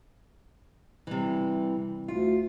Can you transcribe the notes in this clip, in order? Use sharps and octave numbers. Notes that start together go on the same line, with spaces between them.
C3 E3 G3
D2 F4